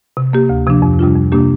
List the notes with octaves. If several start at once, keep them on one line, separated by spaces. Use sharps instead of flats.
C3
A#3 G4
D2
C3 F3 D4
F2
C3 G3 D4 F4
F2
C3 A#3 D4 G4